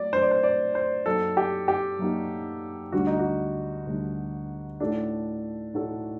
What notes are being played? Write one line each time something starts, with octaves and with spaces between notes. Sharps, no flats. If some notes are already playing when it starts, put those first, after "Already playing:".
Already playing: F#3 A3 D5
F#3 A3 D4 C5
D5
C5
D5
C5
F#2 F#3 A#3 D#4 F#4 A4
G4
G4
F#2 F#3 A#3 D#4 F#4
D2 D3 G3 D4 F#4
D#4
F#4
D2 D3 G3 D4
A2 A3 D4 D#4 F#4 A4
A2 A3 D#4 F#4 A4